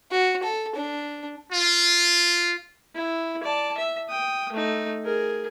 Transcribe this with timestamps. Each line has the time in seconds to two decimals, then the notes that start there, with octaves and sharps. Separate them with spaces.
0.11 F#4
0.43 A4
0.75 D4
1.53 F4
2.95 E4
3.43 D5 A5
3.78 E5
4.09 G5 D#6
4.52 A3 D#4
5.05 G#4 A#4